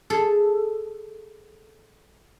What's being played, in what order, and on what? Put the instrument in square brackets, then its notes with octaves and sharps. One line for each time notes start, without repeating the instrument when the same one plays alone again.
[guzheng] G#4 A4